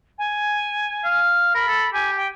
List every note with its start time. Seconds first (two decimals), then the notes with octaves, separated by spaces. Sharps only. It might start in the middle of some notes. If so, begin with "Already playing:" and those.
0.18 G#5
1.05 F5
1.55 A#4 B5
1.68 A4
1.93 G4 G#5
2.16 G5